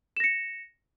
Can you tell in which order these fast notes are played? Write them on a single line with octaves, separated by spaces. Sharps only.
E7 A#6 C#7